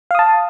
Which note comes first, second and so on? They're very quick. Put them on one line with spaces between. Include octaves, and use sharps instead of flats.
F5 D#6 A5